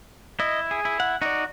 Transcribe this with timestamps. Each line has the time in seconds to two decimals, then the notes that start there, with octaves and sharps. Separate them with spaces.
0.40 E4 D#5
0.71 G#4
0.85 E4
1.00 F#5
1.22 D#4 F#4 D5